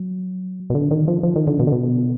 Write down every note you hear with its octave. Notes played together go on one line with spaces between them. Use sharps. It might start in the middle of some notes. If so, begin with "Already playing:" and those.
Already playing: F#3
B2
D3
D#3
F3
F3
D#3
D3
B2
D3
B2